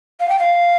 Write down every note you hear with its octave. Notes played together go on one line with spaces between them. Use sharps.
F5
G5
F5